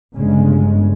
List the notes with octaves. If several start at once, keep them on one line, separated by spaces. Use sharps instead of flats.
G1 C#3 G#3